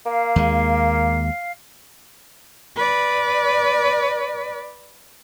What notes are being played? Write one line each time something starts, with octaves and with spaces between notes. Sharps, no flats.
A#3 F5
D#2 G#3
B4 D5